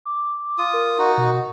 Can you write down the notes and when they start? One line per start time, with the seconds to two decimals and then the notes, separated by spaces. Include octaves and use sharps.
0.05 D6
0.58 F4 D#6
0.73 A#4
0.98 D#4 F#4
1.18 B2